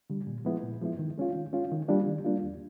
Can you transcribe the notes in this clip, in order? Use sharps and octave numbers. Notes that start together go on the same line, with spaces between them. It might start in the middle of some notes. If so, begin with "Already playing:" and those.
D3 G3
A#2
F3 G#3 B3 E4
A#2
F3 G#3 B3 E4
D#3
G#3 C#4 F4
D#3
G#3 C#4 F4
D#3
G3 A#3 D4 F4
D#3
G3 A#3 D4 F4
E2